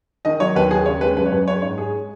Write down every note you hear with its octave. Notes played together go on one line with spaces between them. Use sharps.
D#3 D#5
F#3 C#5
D#2 B4
D#2 G#4
C#3 C#5
G#3 B4
F#2 B4
C#5
F#2 B4
G#3 C#5
G#2 C#5
G#3 G#4